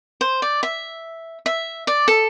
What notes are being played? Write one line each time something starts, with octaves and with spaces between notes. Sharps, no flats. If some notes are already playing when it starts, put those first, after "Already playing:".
C5
D5
E5
E5
D5
A4